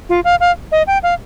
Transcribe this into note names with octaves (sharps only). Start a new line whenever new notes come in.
F4
F5
F5
D#5
G5
F5